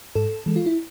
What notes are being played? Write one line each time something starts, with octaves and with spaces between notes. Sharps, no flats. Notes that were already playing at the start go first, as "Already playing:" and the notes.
G#2 A4
E3 G#3
F4
E4